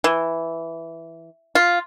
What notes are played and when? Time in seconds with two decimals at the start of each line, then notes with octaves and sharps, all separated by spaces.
0.04 E3
1.55 F4